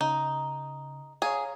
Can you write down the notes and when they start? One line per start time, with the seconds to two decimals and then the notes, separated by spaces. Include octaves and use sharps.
0.01 C#3 D#4
1.22 G#4 C#5 F5 A#5